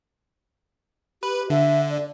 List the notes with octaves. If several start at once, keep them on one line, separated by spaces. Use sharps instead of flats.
G4 B4
D3 E5
D5